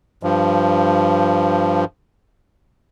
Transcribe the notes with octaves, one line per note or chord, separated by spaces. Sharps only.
G2 F3